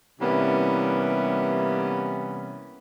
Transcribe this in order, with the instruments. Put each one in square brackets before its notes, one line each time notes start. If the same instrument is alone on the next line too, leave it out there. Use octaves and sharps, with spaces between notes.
[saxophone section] C3 E3 G3 A#3 B3 C#4